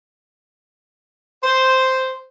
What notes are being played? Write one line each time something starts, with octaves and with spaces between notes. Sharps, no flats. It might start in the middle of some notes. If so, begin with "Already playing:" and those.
C5